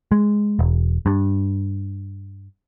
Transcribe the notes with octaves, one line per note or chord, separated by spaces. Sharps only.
G#3
E1
G2